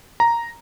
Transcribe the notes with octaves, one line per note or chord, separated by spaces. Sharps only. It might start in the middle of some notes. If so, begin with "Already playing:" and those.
A#5